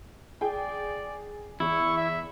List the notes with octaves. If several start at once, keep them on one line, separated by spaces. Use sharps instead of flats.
G#4 D5 G5
E2 E4 C#6
E5